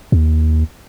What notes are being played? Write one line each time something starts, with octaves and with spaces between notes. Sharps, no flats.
D#2